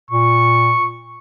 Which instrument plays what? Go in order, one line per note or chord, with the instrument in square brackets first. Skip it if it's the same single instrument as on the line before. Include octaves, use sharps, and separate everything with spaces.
[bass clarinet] A#2 [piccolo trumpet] C#6